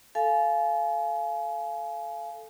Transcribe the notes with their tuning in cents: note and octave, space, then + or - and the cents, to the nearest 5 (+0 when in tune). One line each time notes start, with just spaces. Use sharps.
A4 +0 F5 -15 G#5 +30